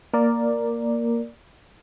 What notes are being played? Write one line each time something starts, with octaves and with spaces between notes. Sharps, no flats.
A#3 A#4 D5